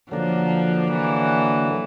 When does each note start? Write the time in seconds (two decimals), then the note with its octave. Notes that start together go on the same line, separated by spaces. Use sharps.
0.11 D3 F3 F#3 A#3 D4
0.91 E3